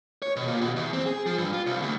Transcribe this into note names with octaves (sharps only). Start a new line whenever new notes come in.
C#5
B2
A#2
B2
E2
C4
G#4
F3
G2
F4
C2
D2